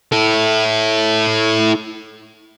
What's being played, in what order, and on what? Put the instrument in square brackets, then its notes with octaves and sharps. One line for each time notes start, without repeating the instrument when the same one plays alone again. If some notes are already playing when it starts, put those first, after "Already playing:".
[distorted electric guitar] E4 A4